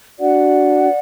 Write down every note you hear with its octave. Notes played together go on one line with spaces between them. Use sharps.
D4 F#4 B4 D5 F#5